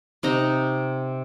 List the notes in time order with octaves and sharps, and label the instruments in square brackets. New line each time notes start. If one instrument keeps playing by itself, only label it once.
[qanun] C3 D#4 A#5